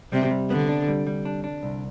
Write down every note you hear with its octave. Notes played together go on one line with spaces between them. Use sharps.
C3 G3
G3
D3 B3
D4
G3
G3
D4
D4
C2